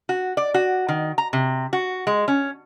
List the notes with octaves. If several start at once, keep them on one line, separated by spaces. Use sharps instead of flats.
F#4
D5
F#4
D#3
A#5
C3
F#4
G#3
C#4